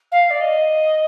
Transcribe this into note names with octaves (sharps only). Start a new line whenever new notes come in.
F5
D5
D#5